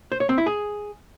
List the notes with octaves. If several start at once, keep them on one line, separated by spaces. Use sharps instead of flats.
C5
C#5
C4
E4
G#4